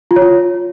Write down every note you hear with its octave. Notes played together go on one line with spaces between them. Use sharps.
F4
C#5
F4